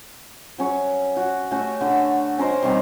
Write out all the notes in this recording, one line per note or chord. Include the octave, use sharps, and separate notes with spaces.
F#3 C#4 C#6
F#4
A3 C#4 F#4 G4
D3 E5
C#4 A#4 C5 D#5
C3 D#3 G3